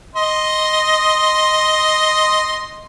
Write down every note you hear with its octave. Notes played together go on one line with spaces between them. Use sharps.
D#5 C6